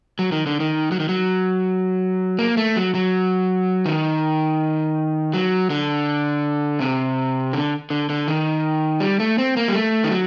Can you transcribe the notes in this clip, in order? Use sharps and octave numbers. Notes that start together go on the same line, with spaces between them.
F#3
D#3
D3
D#3
F#3
D#3
F#3
A#3
A3
F#3
F#3
D#3
F#3
D3
C3
D3
D3
D3
D#3
G3
A3
C4
A#3
G3
A3
D#3
F#3